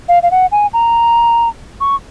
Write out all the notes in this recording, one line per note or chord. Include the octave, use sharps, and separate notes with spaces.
F5
F5
F#5
G#5
A#5
C#6